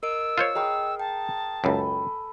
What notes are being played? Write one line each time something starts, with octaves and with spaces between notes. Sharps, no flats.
A#4 D#5 E6 D7
F4 C5 C#5
G#4 A#4 D#5 G5 C#6
G5 A5
C#2 F#2 A4 B4 G#5